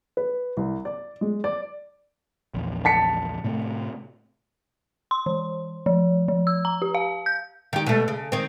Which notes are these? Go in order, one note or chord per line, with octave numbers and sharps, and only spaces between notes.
B4
C2
D5
G#3
D5
A#1 E2
A5 B6 C#7
A2 C3 A3
C6
E3
F3
F3
E6
A#5
G4
F5
G6
D#3 G4
B2 A3
C#3
D#3 C4